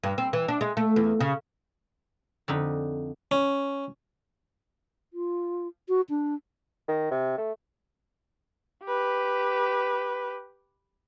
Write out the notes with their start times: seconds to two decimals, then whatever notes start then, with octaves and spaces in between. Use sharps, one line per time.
0.04 G2
0.18 C4
0.33 E3
0.48 D4
0.61 G#3
0.77 A3
0.96 E2
1.21 C#3
2.48 F2 D3 D#4 B5
3.31 C#4
5.13 F4
5.89 F#4
6.09 D4
6.88 D#3
7.11 C3
7.38 A3
8.85 G4 B4